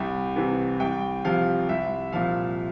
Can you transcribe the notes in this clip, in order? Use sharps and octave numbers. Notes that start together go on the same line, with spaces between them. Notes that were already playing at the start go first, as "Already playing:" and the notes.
Already playing: C2 G5
C3 E3
C2 G5
C3 F3 F5
C2 E5
A#2 F3 F5